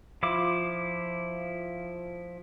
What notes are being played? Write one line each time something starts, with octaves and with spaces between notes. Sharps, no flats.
F3 E4 F4 D6